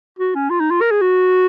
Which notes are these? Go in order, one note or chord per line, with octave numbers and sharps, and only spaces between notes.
F#4
C#4
F4
D#4
F4
A#4
G#4
F#4